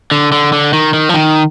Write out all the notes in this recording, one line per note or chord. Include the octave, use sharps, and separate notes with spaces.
D3
D3
D3
D#3
D#3
F3
D#3